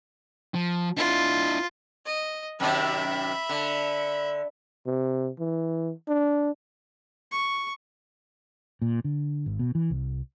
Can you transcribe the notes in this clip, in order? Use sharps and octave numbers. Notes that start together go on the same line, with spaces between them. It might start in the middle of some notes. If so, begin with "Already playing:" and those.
F3
D4 E4 F4
D#5
F#2 C3 D#3 E5 B5
D3
C3
E3
D4
C#6
A#2
D3
G#1
B2
E3
C2